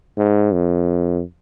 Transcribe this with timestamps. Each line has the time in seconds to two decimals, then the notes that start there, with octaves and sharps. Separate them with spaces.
0.18 G#2
0.53 F2